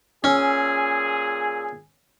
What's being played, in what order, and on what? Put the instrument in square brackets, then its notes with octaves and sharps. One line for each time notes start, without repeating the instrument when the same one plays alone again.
[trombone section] A#2 G#4 [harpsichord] C#4 [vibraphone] G#5 E6